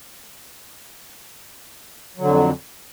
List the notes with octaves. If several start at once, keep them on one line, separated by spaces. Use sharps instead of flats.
F2 D3 F#3